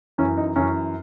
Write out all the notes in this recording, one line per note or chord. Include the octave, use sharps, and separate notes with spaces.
F#2 E3 C#4
D#4
F#2 E3 C#4